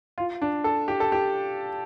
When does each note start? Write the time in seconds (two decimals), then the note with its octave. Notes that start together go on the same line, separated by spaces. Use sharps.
0.18 F4
0.42 D4
0.64 A4
0.88 G4
1.00 A4
1.12 G4